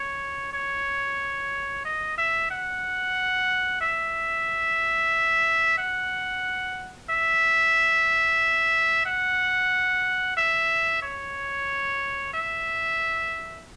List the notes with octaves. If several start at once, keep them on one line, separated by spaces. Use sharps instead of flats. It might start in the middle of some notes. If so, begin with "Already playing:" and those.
Already playing: C#5
C#5
D#5
E5
F#5
E5
F#5
E5
F#5
E5
C#5
E5